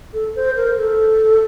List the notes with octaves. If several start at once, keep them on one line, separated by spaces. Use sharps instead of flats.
A4
C5
A#4
A4